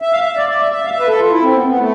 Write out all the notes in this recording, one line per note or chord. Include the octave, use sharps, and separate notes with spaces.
E5
F5
E5
D5
D5
E5
E5
F5
E5
B4
A4
F4
E4
C4
B3
B3
A3